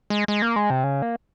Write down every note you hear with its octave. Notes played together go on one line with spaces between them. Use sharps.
G#3
G#3
A#3
G#3
C3
C#3
A#3